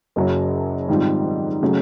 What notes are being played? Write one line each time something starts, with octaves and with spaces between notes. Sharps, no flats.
F#1 F#2 C#3 F#3
G#2 D#3 G3 C4 F4
C#3 F#3 A3 C#4